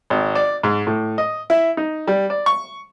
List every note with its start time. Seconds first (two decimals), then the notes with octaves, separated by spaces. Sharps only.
0.10 G#1
0.35 D5
0.63 G#2
0.87 A2
1.18 D#5
1.50 E4
1.77 D#4
2.07 G3
2.30 D5
2.46 C#6